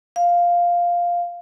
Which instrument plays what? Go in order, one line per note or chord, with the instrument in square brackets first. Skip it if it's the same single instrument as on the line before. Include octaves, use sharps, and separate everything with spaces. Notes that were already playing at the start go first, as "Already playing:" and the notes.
[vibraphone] F5